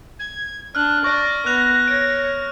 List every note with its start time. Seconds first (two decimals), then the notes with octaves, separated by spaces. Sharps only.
0.19 G#6
0.75 D4 F6 F#6
1.04 D5 C#6 A#6
1.46 B3 F#6 F7
1.88 C#5 D7